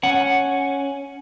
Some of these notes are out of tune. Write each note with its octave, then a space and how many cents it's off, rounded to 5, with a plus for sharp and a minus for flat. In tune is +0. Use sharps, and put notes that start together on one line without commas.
C#4 +0 F#5 +0